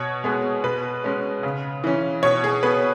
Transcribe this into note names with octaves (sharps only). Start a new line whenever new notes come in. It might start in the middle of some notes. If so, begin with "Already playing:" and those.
Already playing: B2 C#5
G#3 B3 G#4
B2 B4
G#3 C#4
C#3
E3 C#4
B2 C#5
G#4
B3 B4